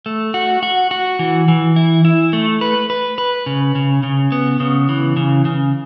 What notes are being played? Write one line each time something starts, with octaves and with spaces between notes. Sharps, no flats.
A3
F#4
F#4
F#4
E3
E3
E4
E4
A3
B4
B4
B4
C#3
C#3
C#3
B3
C#3
E3
C#3
C#3